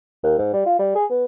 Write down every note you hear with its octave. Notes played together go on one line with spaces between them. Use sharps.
D#2
G#2
G3
F4
G3
G#4
B3